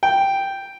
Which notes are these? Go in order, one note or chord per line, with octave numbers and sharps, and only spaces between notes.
G5